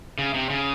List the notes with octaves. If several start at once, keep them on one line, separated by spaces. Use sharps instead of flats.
C#3
C3
C#3